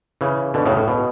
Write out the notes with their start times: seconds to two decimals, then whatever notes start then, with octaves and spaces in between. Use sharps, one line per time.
0.21 C#3 E3
0.54 B2 D3
0.66 A2 C#3
0.77 A2
0.88 B2